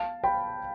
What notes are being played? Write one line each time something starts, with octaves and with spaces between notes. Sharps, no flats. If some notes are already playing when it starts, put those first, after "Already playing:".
Already playing: F5 A5
G5 B5